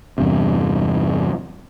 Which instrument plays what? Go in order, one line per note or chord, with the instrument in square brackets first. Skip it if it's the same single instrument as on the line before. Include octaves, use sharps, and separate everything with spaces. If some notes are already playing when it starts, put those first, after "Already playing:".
[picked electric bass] E2 G2 C3